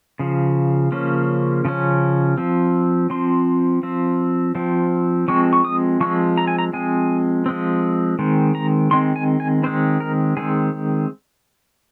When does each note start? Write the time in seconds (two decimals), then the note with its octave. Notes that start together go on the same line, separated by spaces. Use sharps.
0.19 C#3 F3
0.92 C#3 F3 A#3 C#4
1.65 C#3 F3 C#4
2.37 F3 C4
3.10 F3 C4 C6
3.83 F3 C4
4.55 F3 C4
5.28 F3 G#3 C4 C#6
5.53 C#6
5.65 D#6
6.00 F3 G#3 C4 C#6
6.38 A#5
6.47 G#5
6.59 A#5
6.73 F3 G#3 C4 G#5
7.46 F3 G#3 C4
8.19 D#3 G#3 C4
8.55 A#5
8.91 D#3 G#3 C4 C6
9.16 G#5
9.40 G#5
9.64 D#3 G#3 C4 C5
10.00 A#4
10.37 D#3 G#3 C4 G#4